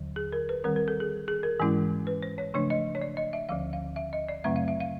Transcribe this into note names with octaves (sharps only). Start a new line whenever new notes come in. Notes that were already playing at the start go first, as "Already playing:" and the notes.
Already playing: D#2 D3 F#3
G#4
A#4
B4
D#3 G3 C4 A#4
A#4
A4
G#4
G#4
A#4
G#2 E3 G#3 C#4 E4
B4
C5
C#5
C#3 F3 A3 D4 C#5
D#5
C#5
D5
D#5
E5
D2 D3 F3 F5
F5
E5
D#5
D5
F#2 C#3 F#3 A3 C4 E5
F5
E5
F5